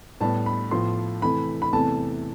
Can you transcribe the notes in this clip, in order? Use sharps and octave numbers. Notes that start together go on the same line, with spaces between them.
A2 G3 B3 A5
B5
A2 F3 B3 C6
C3 E3 A3 B5
B5
E2 C3 E3 A3 A5